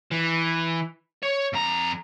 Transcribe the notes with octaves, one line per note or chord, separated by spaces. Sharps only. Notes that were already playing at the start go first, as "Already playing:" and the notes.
E3
C#5
F2 A#5